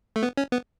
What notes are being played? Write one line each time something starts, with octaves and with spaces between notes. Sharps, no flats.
A3
B3
C#4
B3